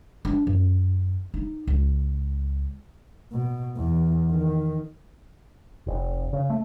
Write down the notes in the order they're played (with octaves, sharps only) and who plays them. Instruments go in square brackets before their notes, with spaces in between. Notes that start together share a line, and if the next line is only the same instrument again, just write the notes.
[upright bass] D4
F#2
D#4
C#2
[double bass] B2
E2
D#3
[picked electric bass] F1
C#3
A3